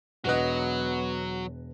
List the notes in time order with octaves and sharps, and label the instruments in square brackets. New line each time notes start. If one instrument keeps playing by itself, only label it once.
[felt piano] E1 B4 F#6 [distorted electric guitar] F#3 [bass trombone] B3 [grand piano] F#4 D#5